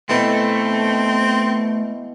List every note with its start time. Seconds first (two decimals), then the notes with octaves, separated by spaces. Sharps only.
0.09 B2 E3 A3 C4 A5